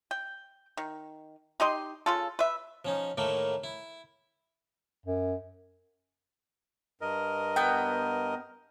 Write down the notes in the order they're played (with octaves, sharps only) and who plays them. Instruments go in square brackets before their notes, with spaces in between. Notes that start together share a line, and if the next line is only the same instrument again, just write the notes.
[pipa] G5
D#3
D#4 G4 D#5 C6
C#3 F4 A4
B4 E5
[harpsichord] F3 C#4 D#4
A2 D#3 A3 A#3
E4
[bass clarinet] F#2
[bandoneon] G2 A#4 D#5
[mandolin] B3 G5